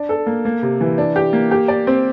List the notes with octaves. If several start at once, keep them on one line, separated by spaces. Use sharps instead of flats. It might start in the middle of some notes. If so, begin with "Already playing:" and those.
Already playing: D4
A4
A#3
A#3
C3
E3
D4
G4
A#3
G4
D5
C4